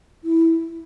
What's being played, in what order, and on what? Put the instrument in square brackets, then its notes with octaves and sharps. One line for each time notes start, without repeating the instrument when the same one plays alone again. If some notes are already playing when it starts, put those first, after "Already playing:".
[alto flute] E4